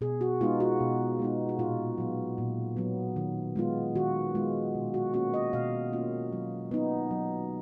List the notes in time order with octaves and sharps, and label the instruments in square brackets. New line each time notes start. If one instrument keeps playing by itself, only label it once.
[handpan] B2 G#4
F#4
G#3 B3 D#4 F4
F#4
B2
G#3 B3 D#4
F#4
A#2 F4
F#3 B3
A#2
F#3 B3
D#3
G#3 B3 F4
D#3 F#4
G#3 B3 F4
B2
F#4
A#3 C#4 F4 F#4
D#5
B2 F5
A#3 C#4 F4
F#3
B3 D#4
F#3